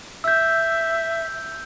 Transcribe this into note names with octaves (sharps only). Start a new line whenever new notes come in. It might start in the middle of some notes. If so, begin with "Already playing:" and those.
E5 E6 G6